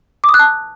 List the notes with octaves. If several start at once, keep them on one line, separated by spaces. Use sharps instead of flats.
D6
D#6
F#6
A5